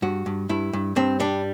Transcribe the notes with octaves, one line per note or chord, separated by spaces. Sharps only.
G2 F#4
G2
G2 E4
G2
G2 C4
G3 D4